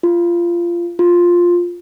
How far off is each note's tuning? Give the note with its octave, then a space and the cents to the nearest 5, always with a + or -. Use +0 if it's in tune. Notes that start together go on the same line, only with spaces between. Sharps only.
F4 -20
F4 +5